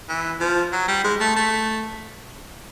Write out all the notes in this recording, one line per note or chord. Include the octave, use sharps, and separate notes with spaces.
E3
F3
F#3
G3
G#3
A3
A3